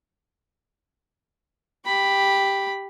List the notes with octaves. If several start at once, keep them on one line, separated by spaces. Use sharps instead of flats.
G4 B5